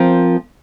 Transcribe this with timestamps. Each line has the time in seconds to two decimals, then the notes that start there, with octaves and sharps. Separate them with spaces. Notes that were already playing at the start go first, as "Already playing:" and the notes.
Already playing: F3 C4 F4 A#4